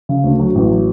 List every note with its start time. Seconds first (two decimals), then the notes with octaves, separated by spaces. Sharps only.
0.09 C#3
0.24 D2
0.39 F#3
0.55 A1
0.71 F#3